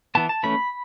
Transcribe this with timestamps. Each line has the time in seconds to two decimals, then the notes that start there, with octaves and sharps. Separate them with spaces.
0.15 E3 B3 A5
0.29 A5
0.43 E3 A3 C#4 B5